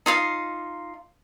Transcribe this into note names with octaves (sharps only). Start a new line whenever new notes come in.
D#4 F4 F5